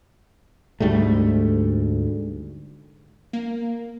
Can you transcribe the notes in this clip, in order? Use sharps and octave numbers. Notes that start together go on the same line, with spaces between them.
D2 G#2 G3 A3
A#3